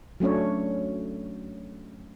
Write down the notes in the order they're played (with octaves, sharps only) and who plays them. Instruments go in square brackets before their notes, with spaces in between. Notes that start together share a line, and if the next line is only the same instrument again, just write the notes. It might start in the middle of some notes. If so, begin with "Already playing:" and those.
[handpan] F#3 A3 C#4 D4 C#5